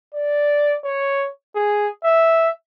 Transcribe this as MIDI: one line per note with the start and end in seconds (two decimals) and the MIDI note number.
0.15 0.76 74
0.85 1.28 73
1.56 1.89 68
2.05 2.50 76